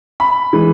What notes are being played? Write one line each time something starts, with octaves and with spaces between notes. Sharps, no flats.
B5
E3 G#3